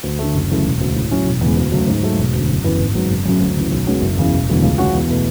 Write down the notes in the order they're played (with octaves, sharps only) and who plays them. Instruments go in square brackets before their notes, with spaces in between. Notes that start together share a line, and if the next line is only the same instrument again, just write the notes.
[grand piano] D2
D3 A3
F#1
F#2 C#3 E3 A3
E1
D2 C#3
A2
F#3 C#4 E4
E1
E2 C#3 G#3
D2
C#3 F#3 A3
G#2
F#3 A3
E1
D2 D3
F#1
F#2 E3 B3
G#1
G#2 F#3 B3
F#1
F#2 C#3 F#3 A3
D2
C#3 E3
B1
B2 G#3 C#4 F#4
F#1
E2 C#3 E3
E1
E2 D3 F#3 A3
C#2
C#3 G#3 C#4 F#4
E2
B2 A3